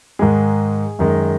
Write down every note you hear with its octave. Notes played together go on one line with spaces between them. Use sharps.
G#2 D#3 G#3 G#4
F#2 D#3 G#3